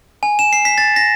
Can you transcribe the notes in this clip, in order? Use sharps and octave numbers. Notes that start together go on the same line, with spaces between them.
G#5
E7
C7
B6
A6
A#6